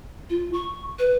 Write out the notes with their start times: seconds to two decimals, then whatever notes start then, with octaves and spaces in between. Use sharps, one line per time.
0.30 F4
0.53 C#6
0.99 B4